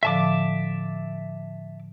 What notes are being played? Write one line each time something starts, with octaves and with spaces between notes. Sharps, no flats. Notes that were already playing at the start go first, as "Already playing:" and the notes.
A2 D3 F3 E5 A5 D6